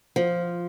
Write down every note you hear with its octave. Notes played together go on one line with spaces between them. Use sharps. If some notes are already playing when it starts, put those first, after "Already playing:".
F3